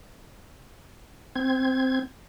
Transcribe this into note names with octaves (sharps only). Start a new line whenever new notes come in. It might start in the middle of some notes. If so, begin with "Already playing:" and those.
C4 G#6